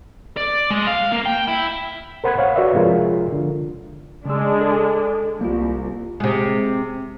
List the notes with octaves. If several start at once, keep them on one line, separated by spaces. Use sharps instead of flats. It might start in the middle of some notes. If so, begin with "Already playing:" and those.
D5
G#3
F5
A#3
G5
E4
A#4 C5 F#5 B5 F#6 G#6
C#5 F5 F#5
F#4 B4 C#5 D5 E5 F#5
C3 F3 G#3 F4 A#4
D3
C#3 G#3 D4 E6
A4
C2 A#3 F4
C3 G#3